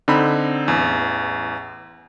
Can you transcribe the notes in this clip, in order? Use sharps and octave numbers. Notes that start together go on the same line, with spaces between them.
D3 C4 D#4 B5
A1 E2